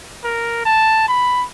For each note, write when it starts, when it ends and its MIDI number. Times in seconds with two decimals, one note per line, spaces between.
0.24 0.60 70
0.65 1.06 81
1.08 1.44 83